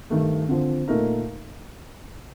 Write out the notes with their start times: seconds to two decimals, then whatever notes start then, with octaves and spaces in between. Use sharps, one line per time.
0.10 G2 D#3 A3
0.49 D3 F3 C4
0.88 A#2 A3 D#4 A#4